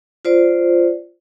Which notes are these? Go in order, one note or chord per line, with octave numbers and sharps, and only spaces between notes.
F4 C5 D5